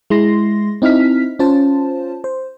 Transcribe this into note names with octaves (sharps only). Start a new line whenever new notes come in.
G#3 E4 C6 A#6
C4 D#4 E4 F6 B6
C#4 F4 C5 A5
C5